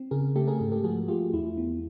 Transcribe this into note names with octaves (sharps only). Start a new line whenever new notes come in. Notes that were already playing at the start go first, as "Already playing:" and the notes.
Already playing: C4
C#3 G#4 A#4
A3 G4 A4
G#4 A#4
G#2 G4 A4
G4 A4
F3 F#4 G#4
A3 F4 G4
E2 E4
B3